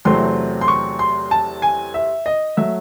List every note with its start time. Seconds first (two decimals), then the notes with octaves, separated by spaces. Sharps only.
0.05 E2 C3 F#3 A3 C4 C6
0.61 C6
0.68 C#6
0.99 C6
1.31 A5
1.62 G#5
1.94 E5
2.26 D#5
2.57 F#3 A3 E5